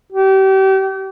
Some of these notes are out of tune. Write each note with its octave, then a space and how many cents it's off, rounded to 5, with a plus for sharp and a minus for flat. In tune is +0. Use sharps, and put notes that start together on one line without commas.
G4 -35